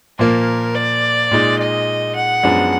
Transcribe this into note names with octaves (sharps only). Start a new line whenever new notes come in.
A#2 F3 A#3 A#4
D5
A#2 G#3 D#4
D#5
F#5
F#2 F3 G#3 B3 D4